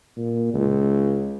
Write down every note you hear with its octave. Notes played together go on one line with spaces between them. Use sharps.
A#2
C#2